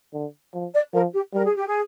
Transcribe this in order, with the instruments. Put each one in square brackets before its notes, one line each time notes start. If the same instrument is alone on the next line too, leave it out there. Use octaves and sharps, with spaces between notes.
[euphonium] D3
F3
[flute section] D5
[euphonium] F3 [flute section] A#4
[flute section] G4
[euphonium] G3 [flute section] A#4
[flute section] G#4
G4
G#4